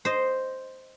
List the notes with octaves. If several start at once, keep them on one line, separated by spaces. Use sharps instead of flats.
C5 D#5